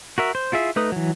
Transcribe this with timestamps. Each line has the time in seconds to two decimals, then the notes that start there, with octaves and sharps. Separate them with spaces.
0.18 F#4 A#4 E5
0.35 C5
0.52 E4 F4 G#4 E5
0.76 A3 D#4 B4 D#6
0.92 E3 F#3